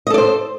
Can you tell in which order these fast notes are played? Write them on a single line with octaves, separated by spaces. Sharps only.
D#5 A4 D5 C5